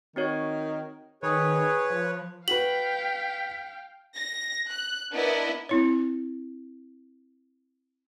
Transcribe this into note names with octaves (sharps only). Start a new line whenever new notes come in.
D#3 C4 F#4 C#5
D#3 G#4 B4 C#5
F3
F#4 B4 F5 G5 B6 F#7
A#6
F#6
B3 D4 E4 A#4 B4 D#5
C4 E4 C#5